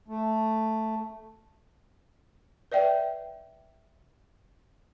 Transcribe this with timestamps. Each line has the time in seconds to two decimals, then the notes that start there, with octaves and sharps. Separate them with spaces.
0.08 A3
2.72 B4 D5 E5 G5